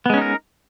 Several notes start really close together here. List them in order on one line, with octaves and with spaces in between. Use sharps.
B3 G#3 C#4 D#4 A#4